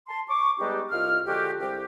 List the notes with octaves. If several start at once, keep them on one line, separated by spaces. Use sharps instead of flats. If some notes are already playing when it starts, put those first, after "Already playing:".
A5 C6
C#6 D6
G3 G#3 B3 D4 D#4 G4
C2 F4 D#5 F6
D3 F3 G#3 F#4 G4
C2 G4